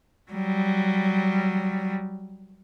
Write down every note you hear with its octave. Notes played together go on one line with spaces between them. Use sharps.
F#3 G3